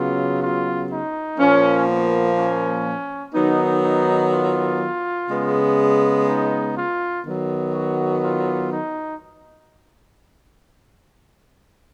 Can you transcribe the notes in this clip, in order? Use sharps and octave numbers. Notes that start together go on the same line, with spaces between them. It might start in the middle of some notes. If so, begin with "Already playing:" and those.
Already playing: C#3 F#3 B3 F4
F4
D#4
A#2 F3 A#3 C#4
B3
C#4
D#3 F#3 B3 D#4
D#4
F4
C#3 G#3 B3
D#4
F4
D#3 F#3 B3
F#4
F4
D#4